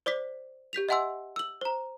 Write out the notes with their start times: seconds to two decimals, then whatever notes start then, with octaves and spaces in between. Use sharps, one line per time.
0.06 C5 D5 D6 B6
0.73 G4 G6 B6 F7
0.89 D#5 E5 F#5 G#5 C6 E6
1.36 E6 F#7
1.61 C5 A#5